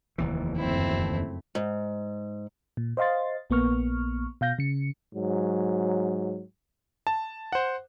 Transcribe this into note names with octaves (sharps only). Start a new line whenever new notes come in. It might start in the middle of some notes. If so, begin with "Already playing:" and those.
F1 D#2 E3
F#1 F2 A3 C4 E4
G#2
A#2
C5 D#5 F5 C6 A6
A#1 A#3 B3 C#6 F6
B2 F5 G6 A#6
C#3 C#7
G#2 F#3
A5
C5 F#5